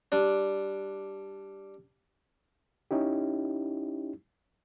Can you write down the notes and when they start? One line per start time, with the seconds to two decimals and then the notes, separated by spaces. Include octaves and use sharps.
0.12 G3 D4
2.91 C#4 D#4 E4 G4